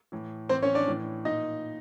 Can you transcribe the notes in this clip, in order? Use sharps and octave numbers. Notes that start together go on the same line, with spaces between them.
A2 E3
A2 E3 C4 C5
C#4 C#5
D4 D5
A2 E3
A#2 D#4 D#5